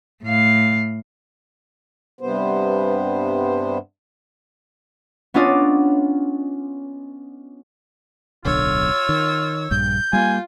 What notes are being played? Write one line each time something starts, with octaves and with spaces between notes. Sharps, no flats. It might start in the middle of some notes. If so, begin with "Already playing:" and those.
A2 F5
G2 C3 B3 C5
B3 C#4 D4 F4 D5 D#5
D1 B1 D3 F4 C#5 E6
D#3
A#1 G2 G6
G3 A#3 F4 G#5